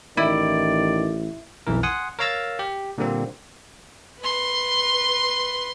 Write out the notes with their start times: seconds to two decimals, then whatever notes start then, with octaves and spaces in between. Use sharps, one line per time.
0.17 A1 D#3 E4 D5
1.67 B1 F2 E3 A#4
1.83 F#5 G#5 C6 D#6
2.19 A#4 C#5 F5 A#5 E6 A6
2.59 G4
2.98 A#2 D3 G3 A#3 C4
4.20 B4 C6